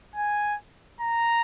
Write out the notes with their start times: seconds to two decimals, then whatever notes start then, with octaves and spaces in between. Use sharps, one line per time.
0.15 G#5
1.01 A#5